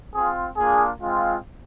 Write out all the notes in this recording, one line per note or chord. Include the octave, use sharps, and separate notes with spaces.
C4 F4 G#4
A#3 D4 F4 G#4
G#3 C4 F4